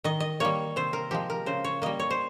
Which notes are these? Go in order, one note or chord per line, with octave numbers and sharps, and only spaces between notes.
D#3 D#5
D#5
G3 A#3 C#5
C3 C5
A#4
F3 G#3 G4
A#4
C#3 C5
C#5
G3 A#3 D#5
C#5
C5